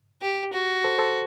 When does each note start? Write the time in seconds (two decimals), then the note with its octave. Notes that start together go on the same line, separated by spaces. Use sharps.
0.22 G4
0.53 F#4
0.84 A4 C5
0.98 A4 C5